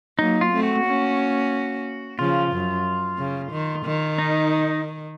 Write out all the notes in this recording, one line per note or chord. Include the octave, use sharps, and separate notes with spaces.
F#3 A#3 D#4
F4
A3 C4
F#4
A#3 C#4
C#3 F3 F4
F#2
C#3
D#3
D#3
D#4